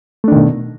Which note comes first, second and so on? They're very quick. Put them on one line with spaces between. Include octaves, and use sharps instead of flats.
A3 D4 D#3 B2